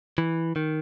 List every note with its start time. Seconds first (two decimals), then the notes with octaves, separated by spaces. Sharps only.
0.18 E3
0.56 D#3